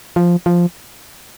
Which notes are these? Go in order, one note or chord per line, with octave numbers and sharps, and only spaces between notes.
F3
F3